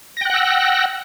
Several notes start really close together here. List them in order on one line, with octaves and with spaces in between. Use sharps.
A#6 G5 F#6 F#5 E6